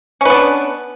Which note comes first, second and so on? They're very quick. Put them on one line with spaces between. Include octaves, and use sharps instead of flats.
C#4 B4 B3 D4